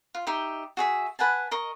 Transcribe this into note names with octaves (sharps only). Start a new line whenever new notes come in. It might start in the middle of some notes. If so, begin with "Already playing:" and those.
F4
D#4 G4 E5
F#4 G#4 E5
B4 F#5 G#5 A5
A#4 D#5 C#6